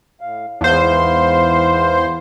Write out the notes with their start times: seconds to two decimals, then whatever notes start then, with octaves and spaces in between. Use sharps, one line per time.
0.21 A2 F5
0.61 E2 G#2 B3 C5 F5